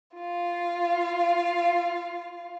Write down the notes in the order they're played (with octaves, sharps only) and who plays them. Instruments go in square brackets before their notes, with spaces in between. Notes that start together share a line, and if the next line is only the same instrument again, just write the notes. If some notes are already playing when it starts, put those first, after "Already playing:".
[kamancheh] F4 F5